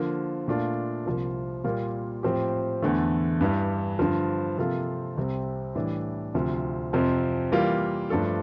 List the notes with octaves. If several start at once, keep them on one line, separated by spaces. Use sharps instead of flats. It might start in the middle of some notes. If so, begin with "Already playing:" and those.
Already playing: D3 F3 A#3
A#2 A3 D4 F4
C2 C3 F3 A#3
A#2 G3 A#3 F4
A2 F3 C4 G4
E2 D3 A3
G2 E3 G3
G2 D3 F3
C3 F3 A#3 F4 A4
C2 C3 G3 C4
A2 E3 G3 D4
D2 C3 F3
F2 C3 F3 C4
E3 G3 A#3 F4
G2 F3 A3 D4 A4